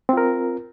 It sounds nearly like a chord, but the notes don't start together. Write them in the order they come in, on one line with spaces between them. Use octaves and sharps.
C4 F4 A#4